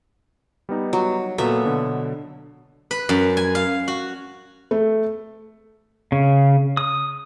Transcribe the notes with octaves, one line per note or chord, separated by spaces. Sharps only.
G3 B3 D#4
F#3
A#2 F#3 B3 A4 E5
B2 D3
B4
F#2
G#5
F5
F#4
A3
C#3
D#6